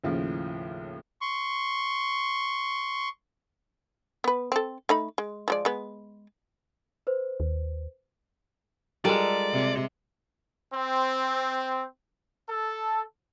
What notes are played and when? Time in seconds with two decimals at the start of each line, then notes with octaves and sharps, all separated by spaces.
0.04 D#2 A2 C#3 F3
1.21 C6 C#6
4.24 B3 B4
4.52 C4 A4
4.89 A3 D#4 B5
5.18 G#3
5.48 F3 G#3 D5
5.65 G#3 B3
7.07 B4 C5
7.40 D#2
9.05 G3 G#3 F4 A4 A#4 D5
9.52 C3
10.74 C4
12.50 A4